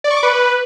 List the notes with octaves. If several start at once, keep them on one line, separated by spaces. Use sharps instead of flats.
D5
C#6
D6
B4